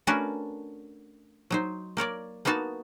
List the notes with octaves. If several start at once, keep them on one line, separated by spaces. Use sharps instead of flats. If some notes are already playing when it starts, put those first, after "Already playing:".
A3 C#4 D4 F#4 A#4 B4
F#3 D#4 C5
A#3 A#4 C#5 D5
A#3 B3 D#4 F#4 A5